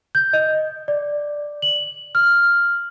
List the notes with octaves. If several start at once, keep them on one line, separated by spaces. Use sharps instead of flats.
G6
D#5
D5
F#7
F6